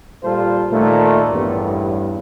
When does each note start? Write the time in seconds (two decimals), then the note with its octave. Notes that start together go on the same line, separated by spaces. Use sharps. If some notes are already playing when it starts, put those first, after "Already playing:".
0.23 A#2 G3 F4 A4 C5
0.71 A#2 D#3 A3
1.30 A1 E2 G2